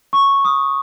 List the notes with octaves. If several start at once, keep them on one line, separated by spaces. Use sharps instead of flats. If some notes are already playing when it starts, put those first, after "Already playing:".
C#6
D#6